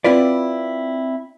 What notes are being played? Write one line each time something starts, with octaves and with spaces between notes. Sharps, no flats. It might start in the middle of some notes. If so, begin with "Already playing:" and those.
C4 E4 F4 B4 D5